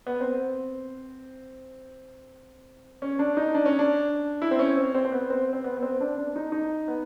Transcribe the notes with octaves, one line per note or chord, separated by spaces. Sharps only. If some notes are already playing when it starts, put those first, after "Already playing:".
B3
C4
C#4
D4
D#4
D4
C#4
D4
E4
C4
C#4
C4
C4
C4
B3
C4
C4
B3
B3
C4
D4
D4
D#4
D#4
B3